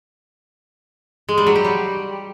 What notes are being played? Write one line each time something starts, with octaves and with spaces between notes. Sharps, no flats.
G#3
G3
F#3
G4
G3